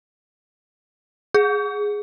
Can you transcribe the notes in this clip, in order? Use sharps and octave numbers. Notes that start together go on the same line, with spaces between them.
G#4